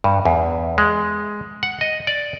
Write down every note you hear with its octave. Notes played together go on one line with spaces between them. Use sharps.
G2
E2
G#3
F#5
D#5
D5